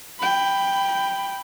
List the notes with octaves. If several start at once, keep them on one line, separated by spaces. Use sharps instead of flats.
G5 B5